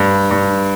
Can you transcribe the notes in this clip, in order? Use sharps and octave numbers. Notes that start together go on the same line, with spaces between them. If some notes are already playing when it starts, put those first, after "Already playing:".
Already playing: G2
G2